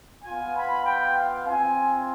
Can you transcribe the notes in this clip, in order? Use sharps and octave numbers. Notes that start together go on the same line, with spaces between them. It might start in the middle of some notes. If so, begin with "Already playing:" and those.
B3 F4 G#5
B5
G5
F5
C4 F4 G#5